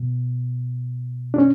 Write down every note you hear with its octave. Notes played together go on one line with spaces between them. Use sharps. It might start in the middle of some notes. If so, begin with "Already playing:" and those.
Already playing: B2
D4
C#4